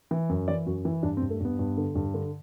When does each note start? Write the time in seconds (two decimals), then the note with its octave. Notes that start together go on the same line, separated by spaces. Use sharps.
0.11 E3
0.29 F#2
0.48 E3 D5
0.66 F#2 F#4
0.85 E3 E4
1.03 G2 D4
1.17 C4
1.22 G2
1.30 A3
1.40 G2 B3
1.59 G2
1.77 D3
1.95 G2
2.14 D3